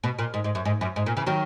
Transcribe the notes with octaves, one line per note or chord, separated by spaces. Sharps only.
B2
A#2
G#2
G#2
F#2
G#2
F#2
G#2
A#2
C#3 E3
D#3 F#3